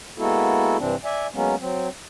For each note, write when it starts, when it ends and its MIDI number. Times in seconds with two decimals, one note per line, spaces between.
0.18 0.77 56
0.18 0.77 58
0.18 0.77 59
0.18 0.77 64
0.18 0.77 66
0.18 0.77 69
0.78 0.96 43
0.78 0.96 48
0.78 0.96 52
0.78 0.96 60
0.78 0.96 62
1.05 1.27 74
1.05 1.27 76
1.05 1.27 80
1.34 1.55 54
1.34 1.55 56
1.34 1.55 58
1.34 1.55 59
1.34 1.55 61
1.60 1.88 54
1.60 1.88 60